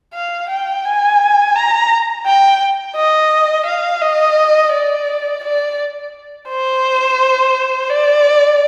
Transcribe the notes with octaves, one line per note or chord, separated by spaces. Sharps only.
F5
G5
G#5
A#5
G5
D#5
F5
D#5
D5
D5
C5
D5